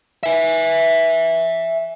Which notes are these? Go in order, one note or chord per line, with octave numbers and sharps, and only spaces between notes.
E5 G#5